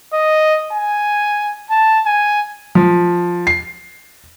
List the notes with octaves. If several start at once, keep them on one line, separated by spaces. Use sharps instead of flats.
D#5
G#5
A5
G#5
F3
C7